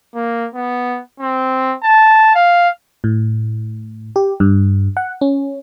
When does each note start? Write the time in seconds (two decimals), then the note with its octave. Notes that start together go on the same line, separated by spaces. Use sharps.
0.15 A#3
0.54 B3
1.20 C4
1.83 A5
2.35 F5
3.04 A2
4.16 G4
4.40 G2
4.97 F#5
5.21 C#4